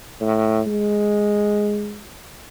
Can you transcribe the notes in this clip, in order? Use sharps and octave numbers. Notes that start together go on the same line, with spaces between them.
A2
G#3